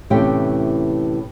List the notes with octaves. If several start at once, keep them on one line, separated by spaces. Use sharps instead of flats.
A2 C3 E3 C#4 G4 G5